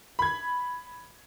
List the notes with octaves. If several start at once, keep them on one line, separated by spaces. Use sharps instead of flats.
B5 G#6